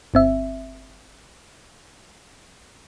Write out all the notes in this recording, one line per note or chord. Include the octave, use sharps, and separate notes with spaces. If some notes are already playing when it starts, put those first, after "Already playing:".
G1 C4 E5